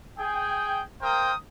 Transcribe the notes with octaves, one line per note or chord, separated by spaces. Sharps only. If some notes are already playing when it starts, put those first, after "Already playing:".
G#4 G5
A#3 A#4 C5 G5 D#6